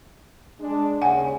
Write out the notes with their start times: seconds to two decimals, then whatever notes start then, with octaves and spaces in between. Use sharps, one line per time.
0.60 G#3 D4
1.01 D#2 C#3 F#5 G#5